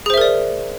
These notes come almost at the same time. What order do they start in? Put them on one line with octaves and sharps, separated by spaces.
G#4 C5 E5 A#4 D5